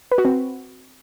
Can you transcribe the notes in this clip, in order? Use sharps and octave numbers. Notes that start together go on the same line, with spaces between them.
B4
F#4
C4